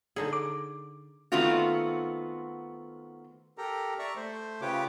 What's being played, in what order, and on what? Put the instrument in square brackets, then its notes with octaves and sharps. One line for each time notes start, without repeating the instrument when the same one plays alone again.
[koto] D3 D#4 G#4
[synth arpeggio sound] D6
[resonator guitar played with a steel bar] D#3 A3 B3 C4 F4 F#4
[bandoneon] G4 A4 A#4 A#5
D5 E5 A#5 C#6
A3 C5
C#3 F4 G4 B4 C#5 D6